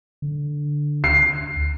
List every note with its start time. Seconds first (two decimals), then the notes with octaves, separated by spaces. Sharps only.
0.22 D3
1.04 D2 C7